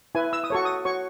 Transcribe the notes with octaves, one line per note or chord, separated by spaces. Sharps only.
E4 B4 G#5
E6
D#6
F#4 A4 C#5 C#6
D#6
F#4 C#5 C#6